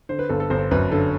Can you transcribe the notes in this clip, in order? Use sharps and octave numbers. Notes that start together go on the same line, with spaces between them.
D3 C5
B4
G1 A4
A4
G1 C5
F#2 B4
D3 A4